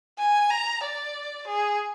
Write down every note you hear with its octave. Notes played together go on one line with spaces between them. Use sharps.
G#5
A#5
D5
G#4